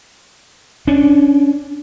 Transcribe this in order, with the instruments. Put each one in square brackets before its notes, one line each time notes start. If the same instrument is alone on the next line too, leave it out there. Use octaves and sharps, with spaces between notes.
[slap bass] C#4 D4